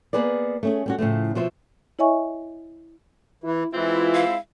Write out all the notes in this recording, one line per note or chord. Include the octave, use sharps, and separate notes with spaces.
A#3 B3 G#4 B4 D5
A3 C#4 G#4
G3 C#4 F#4
A2 C#3 F3 A3
B2 F3 C5 E5
E4 C#5 D#5 E5 G#5 C#6
E3 E4
E3 G#3 C4 E4 F4
F5